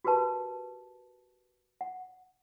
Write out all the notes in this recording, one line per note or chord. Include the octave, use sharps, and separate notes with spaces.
F#4 G4 A#4 B4 A5
F#5